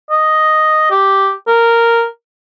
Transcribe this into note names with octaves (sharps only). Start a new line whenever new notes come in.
D#5
G4
A#4